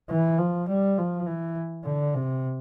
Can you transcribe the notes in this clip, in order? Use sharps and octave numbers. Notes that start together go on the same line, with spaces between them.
E3
F3
G3
F3
E3
D3
C3